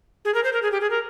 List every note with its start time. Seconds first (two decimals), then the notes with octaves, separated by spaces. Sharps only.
0.25 G#4
0.34 A#4
0.44 C5
0.53 A#4
0.62 G#4
0.72 G4
0.81 G#4
0.90 A#4